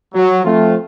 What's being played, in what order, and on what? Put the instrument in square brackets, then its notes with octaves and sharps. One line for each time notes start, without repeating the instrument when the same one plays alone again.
[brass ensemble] F#3
F3 A3 C4 F4